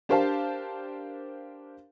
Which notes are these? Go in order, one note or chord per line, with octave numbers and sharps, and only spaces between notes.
D4 G4 A#4 C5 F5 A5